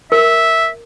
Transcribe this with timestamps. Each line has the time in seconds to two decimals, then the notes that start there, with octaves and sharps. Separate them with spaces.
0.12 A#4 E5